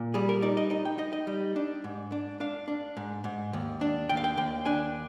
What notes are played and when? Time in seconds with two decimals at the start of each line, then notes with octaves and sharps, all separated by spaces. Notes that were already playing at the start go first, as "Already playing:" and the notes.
Already playing: A#2
0.14 G3 G#4
0.29 A#4
0.42 D#4 D5
0.57 D#5
0.70 D#4 D#5
0.85 G5
0.98 D#4 D#5
1.13 D#5
1.27 G3
1.56 D4
1.84 G#2
2.12 D4
2.40 D4 F5
2.68 D4
2.97 G#2
3.24 G#2
3.53 D#2
3.81 D4
4.09 D#2 G5
4.17 F5
4.24 G5
4.37 D#2 G5
4.65 D4 G#5